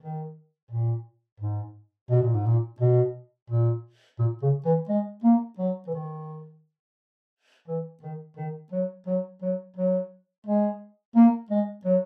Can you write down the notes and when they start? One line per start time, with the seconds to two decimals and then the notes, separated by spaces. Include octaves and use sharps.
0.01 D#3
0.71 A#2
1.40 G#2
2.10 B2
2.22 A#2
2.34 G#2
2.46 A#2
2.80 B2
3.50 A#2
4.19 A#2
4.42 C#3
4.65 E3
4.89 G#3
5.24 A#3
5.58 F#3
5.87 E3
5.94 D#3
7.67 E3
8.02 D#3
8.37 D#3
8.72 F#3
9.07 F#3
9.42 F#3
9.76 F#3
10.46 G#3
11.16 A#3
11.50 G#3
11.85 F#3